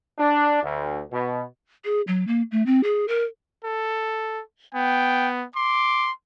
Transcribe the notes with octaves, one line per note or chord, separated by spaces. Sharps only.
D4
D2
B2
G#4
F#3
A#3
A3
C4
G#4
A#4
A4
B3 G5
C6 D6